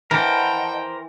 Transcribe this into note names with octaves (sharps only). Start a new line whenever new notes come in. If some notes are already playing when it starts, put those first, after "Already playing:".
E3 A#4 C5 D#5 F#5 G5 A5